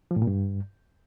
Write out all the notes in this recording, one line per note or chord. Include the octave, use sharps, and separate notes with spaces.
F3
A2
A#2
G2